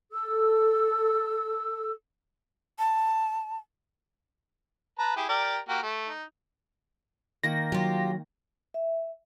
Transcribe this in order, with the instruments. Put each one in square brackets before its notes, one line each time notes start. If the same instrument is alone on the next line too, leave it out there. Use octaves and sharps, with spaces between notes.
[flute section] A4 E6
[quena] A5
[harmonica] B4 A5 A#5
E4 G4 G#4
G4 A#4 D5
A#3 F#4 G4
A3
D#4
[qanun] D#3 A#3 [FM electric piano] A#6
[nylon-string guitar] F#3 [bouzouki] F4 G4
[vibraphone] E5